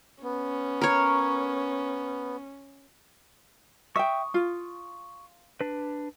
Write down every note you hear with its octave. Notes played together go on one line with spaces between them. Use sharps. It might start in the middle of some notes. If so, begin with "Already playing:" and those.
B3 C#4
A#4 C#5
E5 G5 C#6 D#6
F4
D4 B4